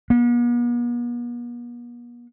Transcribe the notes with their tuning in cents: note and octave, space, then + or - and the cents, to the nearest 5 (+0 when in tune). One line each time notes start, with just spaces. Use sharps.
B3 -45